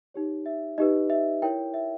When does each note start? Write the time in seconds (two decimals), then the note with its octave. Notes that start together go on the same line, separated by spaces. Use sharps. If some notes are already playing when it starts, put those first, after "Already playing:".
0.14 D#4 G4 C#5
0.46 E5
0.78 D#4 G4 B4 D#5
1.10 E5
1.42 E4 A#4 C#5 G5
1.74 E5